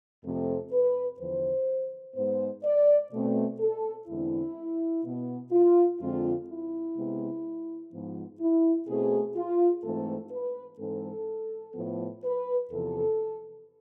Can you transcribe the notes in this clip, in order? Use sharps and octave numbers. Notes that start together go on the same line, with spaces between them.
F2 C3 F3 A3 C4 A4
B4
E2 D3 F3 C5
G#2 G#3 B3 C5
D5
B2 A3 C4
A4
E2 D3 G#3 C4 E4
B2 B3
F4
F2 D3 G#3 C4 F4
E4
C3 G#3 B3
G#2 F3 B3
E4
B2 A3 C4 G#4
F4
G#2 E3 A3 C4 A4
B4
G#2 E3 G#3 C4 A4
A2 F3 B3
B4
E2 C3 F3 A4